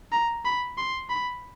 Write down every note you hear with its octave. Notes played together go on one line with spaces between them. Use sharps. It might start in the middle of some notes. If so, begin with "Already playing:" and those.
A#5
B5
C6
B5